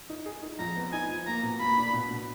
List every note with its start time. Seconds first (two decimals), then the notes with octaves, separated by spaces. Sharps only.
0.10 D#4
0.26 G#4
0.43 D#4
0.59 F2 A#5
0.76 B3
0.92 D#4 G#5
1.09 F3
1.26 A#3 A#5
1.43 B2
1.60 A#3 B5
1.77 D4
1.93 B2
2.11 B2